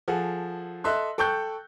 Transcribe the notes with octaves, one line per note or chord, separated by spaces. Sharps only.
F3 G#4 A4 F#5
A4 D#5 E5 C6 F#6
A4 G5 C#6 F#6 G6